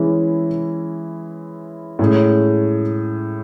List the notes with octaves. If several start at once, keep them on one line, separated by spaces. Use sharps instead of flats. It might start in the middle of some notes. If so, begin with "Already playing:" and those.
Already playing: E3 G#3 C#4 E4
A2 G#3 C#4 G#4